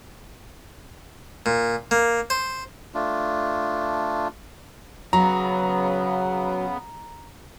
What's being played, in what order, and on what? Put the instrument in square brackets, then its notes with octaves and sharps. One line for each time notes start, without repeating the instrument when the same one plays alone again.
[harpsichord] A#2
A#3
C5
[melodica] A3 D4 F4
[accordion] C#3 B3 [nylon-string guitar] F#3 [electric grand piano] A#5